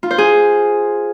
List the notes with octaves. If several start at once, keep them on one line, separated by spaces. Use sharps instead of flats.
F4
C5
G#4